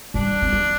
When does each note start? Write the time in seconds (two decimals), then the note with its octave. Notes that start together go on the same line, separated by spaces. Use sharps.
0.14 G3 D4
0.42 C4
0.53 B3